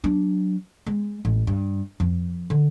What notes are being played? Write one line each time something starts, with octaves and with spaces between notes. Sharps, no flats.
F#3 D4
G#3
A1
G2
F2
D3